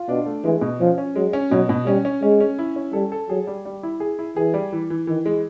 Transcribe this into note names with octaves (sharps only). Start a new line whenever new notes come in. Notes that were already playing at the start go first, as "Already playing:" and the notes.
Already playing: F4
B2 D4
A3
E3 G#3
B2
F3 C#4
C#4
F#3 G#3
C#4
B2 F#3
B2
G3 C#4
C#4
G#3 C#4
C#4
E4
C#4
G3 A4
A4
F#3 G#4
G3
G3
E4
G#4
E4
E3 G#4
G3
E3
E3
D#3 E3
G#3